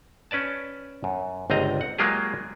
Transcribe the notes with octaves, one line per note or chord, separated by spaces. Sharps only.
C#4 B4 D5 A5
F#2
G1 C#2 C4 D#5 A#5
F#5
F#3 G#3 A#3 F4 G4 G#4